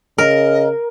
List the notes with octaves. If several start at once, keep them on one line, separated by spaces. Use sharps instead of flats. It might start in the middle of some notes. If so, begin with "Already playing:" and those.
C#3 A#4 D#5